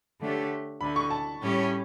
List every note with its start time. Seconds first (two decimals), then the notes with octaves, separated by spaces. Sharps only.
0.20 D3 A3 D4 G4 C#5
0.81 D2 D3 A3 B5
0.96 C#6
1.10 A5
1.41 A2 G3 C#4 G4 C#5